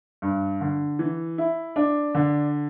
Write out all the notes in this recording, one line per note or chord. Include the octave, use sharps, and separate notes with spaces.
G2
D3
E3
E4
D4
D3